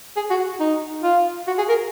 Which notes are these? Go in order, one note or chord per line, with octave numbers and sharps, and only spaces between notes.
G#4
F#4
D#4
F4
F#4
G#4
A#4